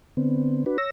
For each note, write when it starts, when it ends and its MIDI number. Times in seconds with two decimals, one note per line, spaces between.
0.17 0.65 50
0.17 0.65 59
0.17 0.65 60
0.66 0.77 62
0.66 0.77 66
0.66 0.77 71
0.78 0.90 73
0.78 0.90 88
0.78 0.90 94